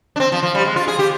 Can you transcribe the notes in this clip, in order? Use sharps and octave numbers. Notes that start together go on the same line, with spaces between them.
D4
C4
F3
F3
G3
G#3
F4
G#4
G4